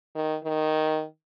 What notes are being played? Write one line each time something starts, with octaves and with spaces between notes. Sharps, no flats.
D#3
D#3